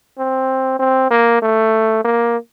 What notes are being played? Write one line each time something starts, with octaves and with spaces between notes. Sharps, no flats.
C4
C4
A#3
A3
A#3